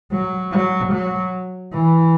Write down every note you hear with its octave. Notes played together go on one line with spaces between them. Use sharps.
F#3
F#3
F#3
E3